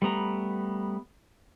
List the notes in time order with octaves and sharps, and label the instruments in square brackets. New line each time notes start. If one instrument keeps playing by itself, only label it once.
[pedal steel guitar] G3 A3 B3 A#5